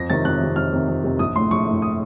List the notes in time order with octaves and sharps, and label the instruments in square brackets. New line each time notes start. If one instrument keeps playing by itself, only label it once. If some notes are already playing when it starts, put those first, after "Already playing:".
Already playing: [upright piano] F2 A#6
C3 D#3 A6
F2 F#6
C3 D#3
F2 F6
C3 D#3
F2
C3 D#3
A#1 D#6
A2 A3 C6
A#1 C#6
A2 A3
D#6